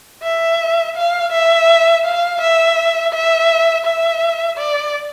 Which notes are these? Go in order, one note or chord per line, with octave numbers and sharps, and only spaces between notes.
E5
F5
E5
F5
E5
E5
E5
D5